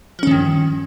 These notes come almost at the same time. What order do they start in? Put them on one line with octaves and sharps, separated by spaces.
F3 C#4 D#3 G2